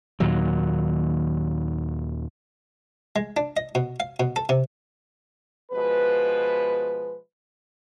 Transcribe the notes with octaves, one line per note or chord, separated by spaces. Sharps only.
D#2 A#2 D#3 F#3
G#3
D4
D#5
B2
F5
B2
A4
C3
B2 F3 G#3 B4